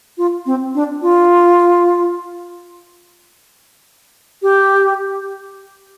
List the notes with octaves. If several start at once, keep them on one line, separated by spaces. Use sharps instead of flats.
F4
C4
D4
F4
G4